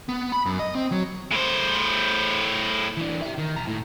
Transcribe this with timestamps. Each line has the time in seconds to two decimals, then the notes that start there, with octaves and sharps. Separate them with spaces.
0.09 B3
0.32 B5
0.46 F#2
0.59 D#5
0.75 C4
0.92 F#3
1.31 A2 C5
2.97 E3 D4
3.22 G4 E5
3.38 D#3
3.56 B1 A#5
3.67 A2